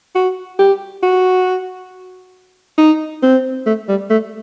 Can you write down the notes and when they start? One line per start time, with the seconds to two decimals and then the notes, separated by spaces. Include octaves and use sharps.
0.15 F#4
0.59 G4
1.03 F#4
2.78 D#4
3.23 C4
3.66 A3
3.88 G3
4.10 A3